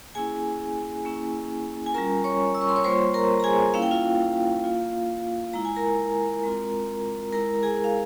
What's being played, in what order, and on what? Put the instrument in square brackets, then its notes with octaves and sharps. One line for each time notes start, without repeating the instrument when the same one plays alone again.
[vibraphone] A#3 C#4 E4 G#4 G#5
A#3 C#4 E4
G#5
G3 C#4 F4 A#4 A#5
C#5 C#6
E6
C#6
C6
C#5 C#6
G3 A#3 F4 C5 C6
A#4 A#5
A#5
G#4 G#5
A#3 C#4 E4 F5
G5
F4 F5
A#3 F4
G#3 E4 A#5
G#5
A#4 A#5
G#3 C4 F4
G#3 E4 A#4 A#5
G#4 G#5
F5